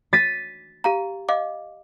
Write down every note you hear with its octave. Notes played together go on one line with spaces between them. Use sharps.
A6 B6 D#7
G4 F5 A#5
D#5 F5 D6